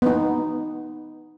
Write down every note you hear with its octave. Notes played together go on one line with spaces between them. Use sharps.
B3 D#4